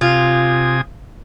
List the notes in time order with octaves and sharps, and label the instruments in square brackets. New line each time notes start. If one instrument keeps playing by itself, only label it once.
[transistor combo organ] C3 G#5 D#6 [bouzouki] F4